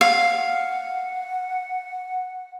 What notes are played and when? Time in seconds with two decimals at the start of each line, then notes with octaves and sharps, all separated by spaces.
0.01 F5 F#5